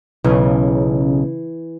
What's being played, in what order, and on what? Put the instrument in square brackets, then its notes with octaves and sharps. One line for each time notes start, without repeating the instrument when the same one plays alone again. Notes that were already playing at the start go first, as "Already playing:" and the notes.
[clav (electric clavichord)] B1 [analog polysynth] C#3 [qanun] E3